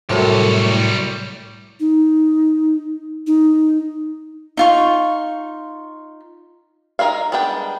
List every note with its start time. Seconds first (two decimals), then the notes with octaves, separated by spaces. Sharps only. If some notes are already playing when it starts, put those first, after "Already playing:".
0.09 C2 F#2 A2 C3 G3 C#5
1.80 D#4
3.27 D#4
4.57 D#4 F4 C#6
6.99 D#4 A#4 B4 E5 F5
7.32 G3 G#3 B3 D4 G5